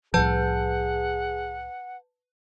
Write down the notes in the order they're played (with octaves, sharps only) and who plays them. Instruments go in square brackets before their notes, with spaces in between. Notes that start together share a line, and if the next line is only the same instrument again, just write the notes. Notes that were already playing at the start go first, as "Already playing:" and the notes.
[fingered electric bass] C2 A2 F3 [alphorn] G#4 [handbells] B4 A5 G6 [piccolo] F#5